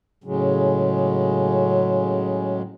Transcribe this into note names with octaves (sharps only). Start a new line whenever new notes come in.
A2 C#3 F#3 G#3